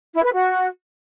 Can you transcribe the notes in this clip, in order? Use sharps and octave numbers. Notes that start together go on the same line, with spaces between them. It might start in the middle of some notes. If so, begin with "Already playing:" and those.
E4
B4
F#4